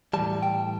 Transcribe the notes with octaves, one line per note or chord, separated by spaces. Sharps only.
A2 E3 G3 A5
G5